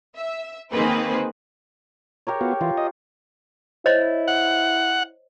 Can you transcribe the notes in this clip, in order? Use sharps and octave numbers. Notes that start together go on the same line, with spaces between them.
E5
D#3 A#3 C4 G#4 B4 C5
G4 A#4 C#5
B3 F4 F#4
E3 F4
D#5
E4 C5 C#5 D#5
F#5